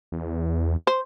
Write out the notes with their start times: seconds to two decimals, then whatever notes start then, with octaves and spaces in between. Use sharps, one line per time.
0.12 E2
0.87 C5